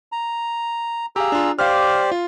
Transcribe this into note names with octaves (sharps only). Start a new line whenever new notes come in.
A#5
G4 G#4 F5 A#5 E6
D4 F4
G4 C5 D5 F5 F6
F4